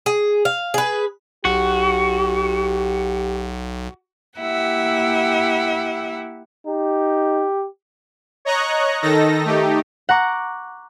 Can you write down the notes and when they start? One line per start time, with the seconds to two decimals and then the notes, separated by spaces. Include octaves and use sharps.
0.06 G#4
0.45 F5
0.74 G#4 B4
1.45 B1 F#4 G4
4.39 A#3 E4 G4 E5 F#5
6.67 D#4 G4
8.45 C#5 D#5 A#5 C#6 F#6
9.02 D#3 D#4 A4 A#6
9.45 A3 D#4 G4
10.09 F#5 A#5 C#6 D6